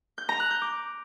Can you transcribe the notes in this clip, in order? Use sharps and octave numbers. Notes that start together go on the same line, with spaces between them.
G6
A#5
F#6
G6
D6